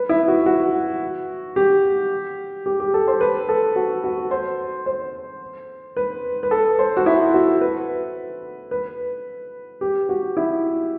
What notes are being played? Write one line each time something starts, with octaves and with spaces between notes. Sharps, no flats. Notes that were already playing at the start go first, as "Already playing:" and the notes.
Already playing: B4
E4
F#4
F#4
G4
G4
G4
A4
C5
B4
A4
F#4
F#4
C5
C5
B4
B4
A4
C5
F#4
E4
F#4
B4
B4
G4
F#4
E4